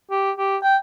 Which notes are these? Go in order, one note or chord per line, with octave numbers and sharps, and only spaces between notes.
G4
G4
G5